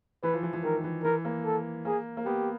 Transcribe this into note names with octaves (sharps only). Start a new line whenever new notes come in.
E3 B4
F3
E3
E3
D#3 A#4
E3
E3 A#4
A#3
A4
A#3 G#4
A#3
B3 G4